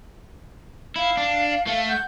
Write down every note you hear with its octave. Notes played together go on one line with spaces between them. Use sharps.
E4 F5
D4
A3
F#5 G6